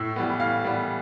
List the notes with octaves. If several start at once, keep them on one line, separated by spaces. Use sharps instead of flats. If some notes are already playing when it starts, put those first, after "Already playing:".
Already playing: A2 E6
E3 G3 B3
A2 F5
E3 G3 B3